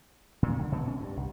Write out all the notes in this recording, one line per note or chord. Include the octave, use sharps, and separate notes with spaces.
A#2
D3
B2
C#4
G2
C2